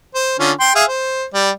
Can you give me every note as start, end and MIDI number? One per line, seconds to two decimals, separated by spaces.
0.15 0.36 72
0.40 0.52 50
0.40 0.52 61
0.40 0.52 65
0.60 0.72 79
0.60 0.72 84
0.76 0.84 68
0.76 0.84 76
0.76 0.84 77
0.88 1.25 72
1.34 1.51 55
1.34 1.51 74